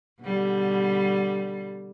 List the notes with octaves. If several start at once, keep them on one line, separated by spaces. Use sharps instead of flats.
B2 D3 G3